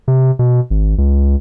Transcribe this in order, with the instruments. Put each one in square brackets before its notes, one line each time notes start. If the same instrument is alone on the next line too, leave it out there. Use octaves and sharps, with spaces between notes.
[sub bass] C3
B2
G#1
C#2